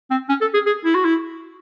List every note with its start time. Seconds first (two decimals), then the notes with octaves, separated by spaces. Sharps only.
0.11 C4
0.29 C#4
0.41 A4
0.54 G#4
0.66 G#4
0.85 E4
0.95 F#4
1.05 E4